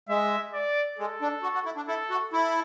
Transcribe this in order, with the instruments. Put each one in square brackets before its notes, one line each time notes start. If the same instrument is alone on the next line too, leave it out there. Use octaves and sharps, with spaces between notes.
[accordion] G#3 [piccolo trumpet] E5
[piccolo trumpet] D5
[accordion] G#3 [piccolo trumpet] A4
[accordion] D4
F#4
F#4
E4
D4
[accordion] E4 [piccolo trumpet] A4
[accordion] F#4
[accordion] E4 [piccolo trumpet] A4